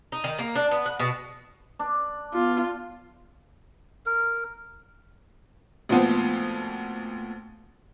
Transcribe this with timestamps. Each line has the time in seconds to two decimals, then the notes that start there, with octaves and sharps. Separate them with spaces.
0.12 D#4
0.24 D#3
0.39 A#3
0.55 D4
0.71 B3
0.86 F#5
1.00 B2
1.79 D4
2.34 B3 F4
4.06 A#4
5.89 D2 A#2 F3 B3 C4